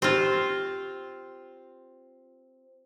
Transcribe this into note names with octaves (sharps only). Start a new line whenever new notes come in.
C4 F4 G4 C5